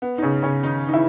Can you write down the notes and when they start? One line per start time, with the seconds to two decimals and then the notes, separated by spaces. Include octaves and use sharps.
0.02 B3
0.18 D#4
0.22 C#3 C#4
0.43 C#3 C#4
0.63 D#3 D#4
0.88 D#4
0.93 E3 E4